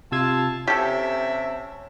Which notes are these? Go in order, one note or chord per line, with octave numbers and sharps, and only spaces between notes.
C3 F4 A5 E6 G#6
C3 C#4 G4 A4 C#5 E5 A5